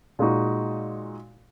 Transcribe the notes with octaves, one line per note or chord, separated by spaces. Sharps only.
A#2 G#3 D#4 F#4